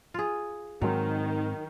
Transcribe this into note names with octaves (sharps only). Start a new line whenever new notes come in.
F4 G#4
G#2 D#3 F#3 G#3 C4